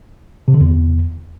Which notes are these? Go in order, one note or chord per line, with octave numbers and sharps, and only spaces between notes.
C3
D3
E2